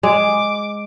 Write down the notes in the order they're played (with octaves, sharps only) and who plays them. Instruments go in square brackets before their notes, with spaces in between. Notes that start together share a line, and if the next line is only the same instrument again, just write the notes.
[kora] G#3 [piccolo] D6